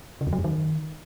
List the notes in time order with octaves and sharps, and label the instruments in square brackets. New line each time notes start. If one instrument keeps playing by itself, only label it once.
[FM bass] C#3
E2
F#3
F#2
D#3